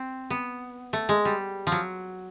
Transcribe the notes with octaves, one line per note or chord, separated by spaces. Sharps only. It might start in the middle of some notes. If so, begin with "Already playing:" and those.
Already playing: C4
B3
A3
G#3
G3
F3
F#3